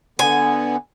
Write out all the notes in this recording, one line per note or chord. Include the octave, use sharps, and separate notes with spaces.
D3 B3 G#5